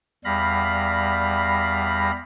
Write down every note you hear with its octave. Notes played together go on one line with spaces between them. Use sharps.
E2 G3 F5 B5 A#6